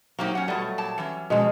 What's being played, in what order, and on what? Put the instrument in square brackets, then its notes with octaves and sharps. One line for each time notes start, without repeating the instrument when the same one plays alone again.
[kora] F#3 G4 [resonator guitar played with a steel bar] A#3 C4 D#4
[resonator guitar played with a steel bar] C#4 F#5
[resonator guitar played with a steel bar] B2 A3 [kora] F#3 G3
[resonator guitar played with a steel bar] A#2 A5
E3 C#4
[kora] B2 G#3 [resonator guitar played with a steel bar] F3 C#4